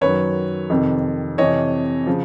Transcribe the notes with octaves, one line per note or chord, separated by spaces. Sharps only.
F#2 D#3 F#3 B4 C#5
F2 C3 D#3
F2 C3 E3 C#5 D#5
C#3 F3